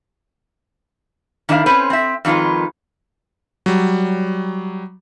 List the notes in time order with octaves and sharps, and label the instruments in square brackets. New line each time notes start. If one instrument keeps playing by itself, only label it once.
[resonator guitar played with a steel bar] D#3 D4 E4 D#5 F5
C4 C#4 B4 C5
C4 E5
F2 D#3 G#3 F4 B4
[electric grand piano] F#3 G3